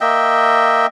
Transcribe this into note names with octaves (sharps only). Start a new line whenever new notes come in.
A#3 D#5 E5 G5